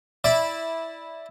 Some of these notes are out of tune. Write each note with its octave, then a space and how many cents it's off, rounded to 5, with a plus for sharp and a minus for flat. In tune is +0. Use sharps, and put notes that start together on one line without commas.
E4 -10 D5 +0